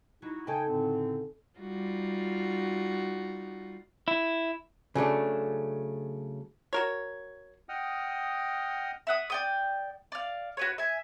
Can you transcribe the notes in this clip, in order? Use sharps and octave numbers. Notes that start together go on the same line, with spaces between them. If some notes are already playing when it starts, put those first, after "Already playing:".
F#3 D#4 E4 F#4
C#3 D#4 A4 G5 G#5
A2 D3 C4
G3 D#4 F4 F#4
E4
C#3 F#3 A3 D4
F#4 A#4 C#5
D#5 F#5 G5 D#6 F6
E5 F#5 D#6
D5 G5 D#6
D5 F5
F#4 B4 C#5
E5 G#5